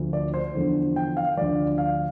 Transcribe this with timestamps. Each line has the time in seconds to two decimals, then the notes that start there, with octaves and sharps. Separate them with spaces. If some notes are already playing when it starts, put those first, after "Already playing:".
Already playing: D2 D3 F3
0.13 D5
0.34 C5
0.54 E2 D3 F3
0.96 G5
1.17 F5
1.37 D2 D3 F3 D5
1.78 F5